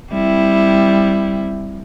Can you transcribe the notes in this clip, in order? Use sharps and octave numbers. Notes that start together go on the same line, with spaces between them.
G3 C4 E4